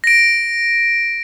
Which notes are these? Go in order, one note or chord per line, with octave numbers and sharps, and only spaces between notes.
A#6 D7